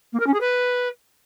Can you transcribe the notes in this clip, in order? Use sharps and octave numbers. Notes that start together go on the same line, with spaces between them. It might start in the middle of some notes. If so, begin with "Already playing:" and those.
A#3
A#4
C#4
G#4
B4